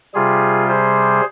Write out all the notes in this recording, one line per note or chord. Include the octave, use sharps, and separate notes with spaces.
C3 G3 F4 G#4
G#4 C5